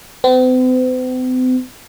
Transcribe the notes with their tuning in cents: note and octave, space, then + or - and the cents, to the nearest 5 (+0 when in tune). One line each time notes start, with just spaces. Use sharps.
C4 -45